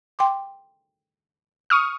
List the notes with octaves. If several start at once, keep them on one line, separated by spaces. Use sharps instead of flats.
G5 C6 D6
C#6 D#6 F6